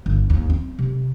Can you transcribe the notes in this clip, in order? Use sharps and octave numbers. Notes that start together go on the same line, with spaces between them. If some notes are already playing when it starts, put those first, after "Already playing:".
G1
D#2
C4
C3